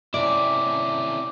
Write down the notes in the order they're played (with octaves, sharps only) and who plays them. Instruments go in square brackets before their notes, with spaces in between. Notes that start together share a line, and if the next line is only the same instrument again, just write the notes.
[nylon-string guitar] C3 D5 [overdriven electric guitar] C#4 E4 [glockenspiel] D6